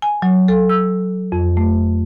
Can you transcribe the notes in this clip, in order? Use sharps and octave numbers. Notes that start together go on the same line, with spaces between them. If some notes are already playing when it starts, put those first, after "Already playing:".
G#5
F#3
A4
E6
F2
A3